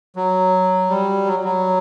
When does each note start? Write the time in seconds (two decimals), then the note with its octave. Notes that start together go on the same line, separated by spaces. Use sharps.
0.16 F#3
0.90 G3
1.27 F#3
1.44 F#3